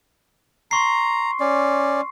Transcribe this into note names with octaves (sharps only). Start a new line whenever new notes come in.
A#5 C6 C#6 C7
C#4 D5